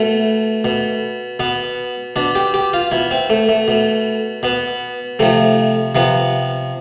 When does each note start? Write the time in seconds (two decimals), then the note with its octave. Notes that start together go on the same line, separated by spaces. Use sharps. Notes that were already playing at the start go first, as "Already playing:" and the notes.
Already playing: B2 A3
0.65 B2
1.40 B2 B3
2.16 B2 D4
2.35 G4
2.54 G4
2.74 F4
2.91 B2 E4
3.11 C4
3.30 A3
3.49 A3
3.68 B2
4.43 B2 B3
5.19 C3 F3 A3
5.95 C3 F3 B3